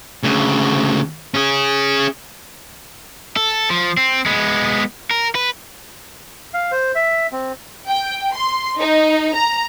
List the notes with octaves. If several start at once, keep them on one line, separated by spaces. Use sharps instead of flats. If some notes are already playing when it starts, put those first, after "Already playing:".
D2 C#3
C#4 G#4
A4
F3
C4
G#3 B3
A#4
B4
F5
C5
E5
C4
G5
C6
D#4
A#5